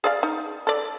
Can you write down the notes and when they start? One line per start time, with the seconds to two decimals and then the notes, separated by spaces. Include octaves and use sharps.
0.04 G#4 D5 F5
0.23 D#4
0.67 A4 D5